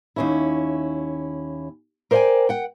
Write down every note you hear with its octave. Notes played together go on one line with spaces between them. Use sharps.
D#2 C#4 E4
A#4 C5 D5 D#5 G5 G#5
F#5 G5